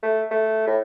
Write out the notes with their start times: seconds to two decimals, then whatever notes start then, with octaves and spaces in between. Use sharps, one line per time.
0.03 A3
0.31 A3
0.67 A2